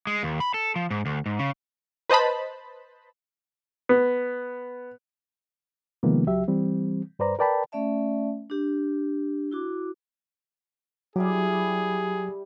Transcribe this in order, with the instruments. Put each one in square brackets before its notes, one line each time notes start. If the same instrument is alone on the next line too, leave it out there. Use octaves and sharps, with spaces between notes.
[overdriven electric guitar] G#3
D#2
B5
A4
F3
G#2
D2
G#2
C#3
[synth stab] B4 C5 D#5 A5 B5
[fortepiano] B3
[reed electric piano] C3 D#3 F3 G#3 A#3 B3
C#2 F#3 G4 E5
E3 G3 C4
G2 B4 C5 D5 A#5
A#4 B4 D5 G5 A5 B5
[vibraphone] A3 C#4 D5 E5 A5
D4 G4
E4 F#4 D6
[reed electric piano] F#3 [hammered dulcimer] G3 E4 G4 [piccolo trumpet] G#4